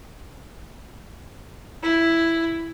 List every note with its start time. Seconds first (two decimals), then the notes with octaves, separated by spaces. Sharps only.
1.83 E4